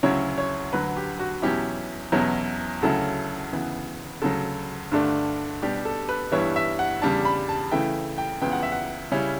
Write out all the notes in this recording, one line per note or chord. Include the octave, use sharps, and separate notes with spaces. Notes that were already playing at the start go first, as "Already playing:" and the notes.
D2 C#3 F#3 C#4 E4 C#5
C#5
D2 D3 F#3 B4
G4
F#4
E2 B2 F#3 C#4 E4 G4
E2 B2 F#3 C#4 E4
D2 C#3 F#3 C#4 E4 A4
D2 C#3 E3 B3
D2 C#3 F#3 A4
G2 D3 A3 D4
B2 G3 D4 G4
A4
B4
G2 E3 G3 B3 E4 C#5
E5
F#5
E2 C#3 G3 D4 A5
B5
A5
C#3 E3 A3 E4 G5
G5
C#2 C#3 E3 B3 G5
F#5
E5
F#5
C#3 G3 C#4 E4